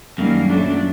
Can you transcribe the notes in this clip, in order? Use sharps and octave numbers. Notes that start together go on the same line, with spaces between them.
F#2 D#3 G3 A#3
A#2 F#3 A3 D4